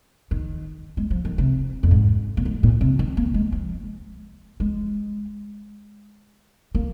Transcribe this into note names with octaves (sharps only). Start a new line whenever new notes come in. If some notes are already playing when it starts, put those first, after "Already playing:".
D#3
G#3
F3
D#3
C3
F2
G#2
A#2
G#2
A#2
C3
D#3
A#3
G#3
F3
G#3
A#3